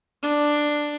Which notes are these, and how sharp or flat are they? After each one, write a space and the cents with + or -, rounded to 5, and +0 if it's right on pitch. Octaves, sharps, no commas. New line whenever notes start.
D4 +5